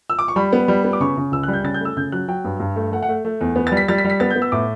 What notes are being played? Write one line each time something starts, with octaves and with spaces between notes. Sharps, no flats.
E6
D6
C#6
G3 B5
B3
G3
B3
D6
C#3 C#6
C#3
C#2 E6
F#6
G3
G6
C#3 A6
G6
A3 E6
C#3 G6
F#3 F#6
F#3 G5
G2
G2
A3
A3 F#5
F#5
A3
A3
E2
B3
A6
G3
B6
G3 A6
B6
G3
B6
B3 A6
G6
B3
E6
A2 D6